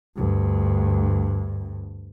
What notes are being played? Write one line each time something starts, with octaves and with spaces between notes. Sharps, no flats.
D2 G2